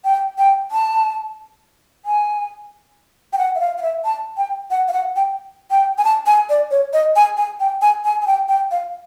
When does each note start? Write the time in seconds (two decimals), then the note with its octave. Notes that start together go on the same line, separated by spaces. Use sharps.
0.05 G5
0.38 G5
0.71 A5
2.05 G#5
3.33 G5
3.38 F#5
3.55 E5
3.60 F5
3.78 F5
3.82 E5
4.05 A5
4.37 G5
4.71 F#5
4.88 F5
4.93 F#5
5.16 G5
5.71 G5
5.98 G#5
6.04 A5
6.26 G#5
6.49 D5
6.71 C#5
6.93 D#5
7.16 G#5
7.37 G#5
7.60 G5
7.82 G#5
8.04 G#5
8.22 G#5
8.27 G5
8.49 G5
8.71 F5